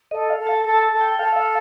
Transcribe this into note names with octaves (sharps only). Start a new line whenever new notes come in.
A4 D#5
F5
A4
A5
A4 A5
A5
A4
G5
A4 F5
F5